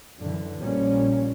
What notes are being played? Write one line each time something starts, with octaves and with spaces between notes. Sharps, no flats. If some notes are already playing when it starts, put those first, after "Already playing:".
F#2 D3 E3
A#1 A#2 F3 G3 A#3 C#4